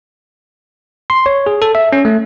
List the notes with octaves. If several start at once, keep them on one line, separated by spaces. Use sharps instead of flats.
C6
C#5
G#4
A4
E5
C#4
A3